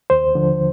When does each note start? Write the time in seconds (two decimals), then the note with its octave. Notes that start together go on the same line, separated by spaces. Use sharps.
0.10 D#2 C5
0.35 D3 F3